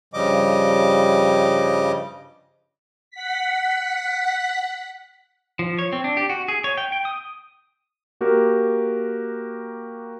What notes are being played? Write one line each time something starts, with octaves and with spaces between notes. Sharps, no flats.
G2 C#3 F3 G3 D#5 D6
F#5 B6
F3
C#5
C4
D4
G4
F#4
G#4
C#5
G5
G5
D#6
A#3 F#4 G4 A#4